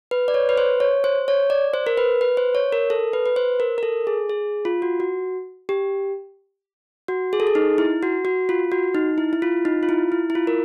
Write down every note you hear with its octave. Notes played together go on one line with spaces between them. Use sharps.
B4
D5
C#5
B4
C5
C#5
C5
C#5
D5
C5
A#4
B4
B4
C5
C#5
A#4
A4
B4
B4
C5
A#4
A#4
A4
G#4
G#4
F4
F#4
F#4
G4
F#4
G#4
A4
G#4
D#4
E4
F#4
F#4
F4
F#4
D#4
E4
E4
F4
D#4
F4
E4
E4
E4
F4
A#4